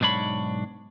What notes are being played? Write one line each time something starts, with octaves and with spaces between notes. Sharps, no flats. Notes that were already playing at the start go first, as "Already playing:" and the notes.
B1 G#2 D4 C#5 B5